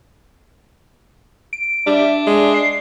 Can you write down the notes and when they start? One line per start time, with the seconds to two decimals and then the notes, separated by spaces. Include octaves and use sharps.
1.53 D7
1.87 G3 D4 E5
2.27 G#3
2.54 C7